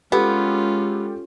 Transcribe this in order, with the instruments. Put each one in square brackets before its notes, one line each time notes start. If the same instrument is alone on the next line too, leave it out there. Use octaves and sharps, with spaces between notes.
[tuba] G#3 [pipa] B3 [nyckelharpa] C#4 F4 [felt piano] G4 A4